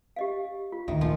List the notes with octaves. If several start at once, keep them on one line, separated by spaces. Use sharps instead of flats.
G4 D#5 F5
F4
A1 D2 D#3 E5
G1 D2 A#2 F3